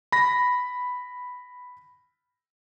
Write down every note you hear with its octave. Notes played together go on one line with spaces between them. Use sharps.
B5 A#6